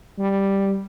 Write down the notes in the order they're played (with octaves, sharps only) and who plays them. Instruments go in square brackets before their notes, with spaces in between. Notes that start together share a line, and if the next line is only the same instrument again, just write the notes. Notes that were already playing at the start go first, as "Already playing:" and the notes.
[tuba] G3